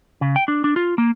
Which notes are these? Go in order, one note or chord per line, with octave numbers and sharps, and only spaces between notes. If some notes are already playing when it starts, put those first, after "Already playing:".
C#3
G5
D4
D4
F4
A#3